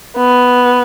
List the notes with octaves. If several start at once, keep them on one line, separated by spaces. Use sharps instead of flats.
B3